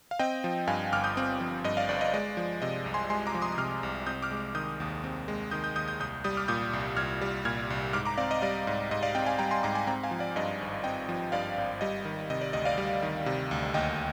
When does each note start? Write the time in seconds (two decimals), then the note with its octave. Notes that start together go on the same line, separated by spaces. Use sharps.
0.11 F5
0.19 C4 D#5 G5
0.44 F3
0.67 G2 F5 G#5
0.93 G1 D6 F6
1.04 D#6 G6
1.17 C4
1.40 F3
1.64 G2 D#5
1.77 D5 F5
1.89 G1 D5
2.01 D#5
2.14 G#3 D5
2.37 F3
2.62 C3 D#5
2.86 C2
2.94 G#5 C6
3.10 G#3 G#5 C6
3.27 A#5 D6
3.34 F3
3.42 C6 D#6
3.52 D#6
3.58 C3 D6 F6
3.83 C2
4.06 C4 D#6 G6
4.22 D6 F6
4.31 G#3
4.55 D#3 D#6 G6
4.80 D#2
5.04 C4
5.28 G#3
5.51 D#3 D#6 G6
5.64 D#6 G6
5.76 D#2 D#6 G6
5.88 D#6 G6
6.00 C2 D#6 G6
6.24 G3 D#6 G6
6.37 D6 F6
6.48 A#2 D#6 G6
6.73 C2
6.97 C2 F6 G#6
7.21 G3
7.45 A#2 F6 G#6
7.70 C2
7.93 G#2 D6 F6
8.05 A#5 D6
8.18 C4 D5 F5
8.31 D#5
8.42 G3 D5 F5
8.67 G#2
8.91 G#2 D#5
9.03 D5 F5
9.15 C4 D#5 G5
9.26 F5 G#5
9.39 G3 G5 A#5
9.51 G#5 C6
9.63 G#2 A#5 D6
9.75 G#5 C6
9.87 C4 G5 A#5
10.03 F5 G#5
10.11 F3
10.19 D5 F5
10.36 G2 D#5
10.61 G#1
10.84 C4 D#5 G5
11.09 F3
11.32 G2 D5 F5
11.57 G#1
11.81 G3 D#5
12.05 D#3
12.30 C3 D#5
12.41 D5
12.53 D2 D#5
12.65 D5 F5
12.78 G3
13.02 D#3
13.26 C3
13.51 D2
13.74 D#2 D#5 G5